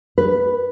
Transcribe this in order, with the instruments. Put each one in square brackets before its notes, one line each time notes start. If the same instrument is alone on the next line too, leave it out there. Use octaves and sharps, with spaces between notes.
[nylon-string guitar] B4